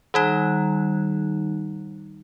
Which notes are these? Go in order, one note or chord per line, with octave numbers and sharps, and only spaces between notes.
D#3 G3 D#4